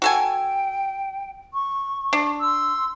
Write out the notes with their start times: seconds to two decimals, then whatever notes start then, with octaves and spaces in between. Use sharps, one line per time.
0.02 F#4 A4 G5 G#5
1.51 C#6
2.13 D4
2.40 C6 E6